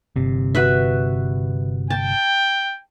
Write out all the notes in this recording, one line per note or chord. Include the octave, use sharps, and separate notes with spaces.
G1 C3
F#4 B4 E5
G5 A5